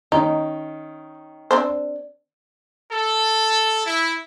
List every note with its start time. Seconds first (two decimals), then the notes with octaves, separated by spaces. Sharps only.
0.12 D#3 C#4 D#4
1.51 C4 D4 C5
2.90 A4
3.85 E4